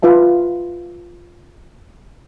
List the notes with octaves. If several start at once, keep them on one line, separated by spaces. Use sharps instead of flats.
F4 B4 E5 A5